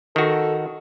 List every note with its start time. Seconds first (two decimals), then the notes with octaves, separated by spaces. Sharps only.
0.16 D#3 F#4 A4